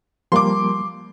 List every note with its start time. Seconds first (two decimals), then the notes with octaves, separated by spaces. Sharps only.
0.32 F3 G3 A#3 C6 D6